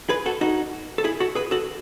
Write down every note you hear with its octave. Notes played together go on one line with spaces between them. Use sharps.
G#4 B4
F#4 A4
D#4 F#4
A4
E4 G#4
F#4 A4
G#4 B4
F#4 A4